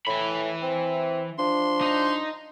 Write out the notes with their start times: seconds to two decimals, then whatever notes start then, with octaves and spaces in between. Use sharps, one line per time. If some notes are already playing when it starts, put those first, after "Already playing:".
0.07 A2 E3 B5
0.63 C4
1.39 F3 D4 C6
1.81 D#4